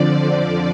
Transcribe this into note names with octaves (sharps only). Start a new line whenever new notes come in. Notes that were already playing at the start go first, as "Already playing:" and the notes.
Already playing: F2 D3 F3 D5
D5